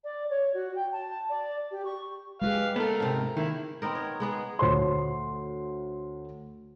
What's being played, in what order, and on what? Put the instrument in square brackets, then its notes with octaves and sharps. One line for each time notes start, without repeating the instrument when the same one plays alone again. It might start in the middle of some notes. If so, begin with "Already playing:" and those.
[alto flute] D5
C#5
F#4
G5
A5
D5
G4
C#6
[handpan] G#3 G4 G#4 [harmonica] B4 F5
[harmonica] A3 A#4 [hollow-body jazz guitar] B3 A4
[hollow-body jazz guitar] G#2 C3
[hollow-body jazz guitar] D#3 [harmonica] A#3 E4
[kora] B3 C4 D#4 A#4
C#5
G#3 B3 G#4
[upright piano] D2 C5 C#5 C6